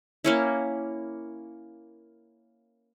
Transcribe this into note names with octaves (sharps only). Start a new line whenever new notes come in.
A#3 C#4 E4